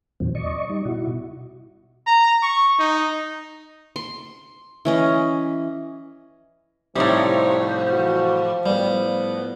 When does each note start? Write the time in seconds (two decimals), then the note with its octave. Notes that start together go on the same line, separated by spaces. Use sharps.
0.20 E2 A#2 D#3 F3 F#3 C4
0.35 D5 D#5 C#6
0.69 G3 D#4
0.85 B2 E4 F#4
2.07 A#5
2.43 C#6
2.79 D#4
3.96 C6
4.85 E3 C#4 D#5
6.96 A2 C3 F3 G3 D#4 F4 C#5
7.90 E3 F#4
8.66 A2 G3 B3